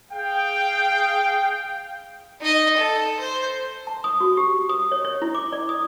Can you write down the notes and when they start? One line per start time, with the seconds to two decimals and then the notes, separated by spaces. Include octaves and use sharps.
0.11 G#4 F5 G5
2.41 D#4 D#5
2.77 A4
3.19 C5
3.87 A5
4.04 D#6
4.20 F#4
4.37 G4
4.69 D#6
4.91 C#5
5.05 C#5
5.22 E4
5.35 D6
5.52 D5
5.69 D#6